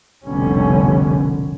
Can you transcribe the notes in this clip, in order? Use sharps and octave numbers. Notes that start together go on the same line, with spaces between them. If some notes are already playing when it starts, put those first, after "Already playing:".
F1 C2 B2 D3 G3 C#4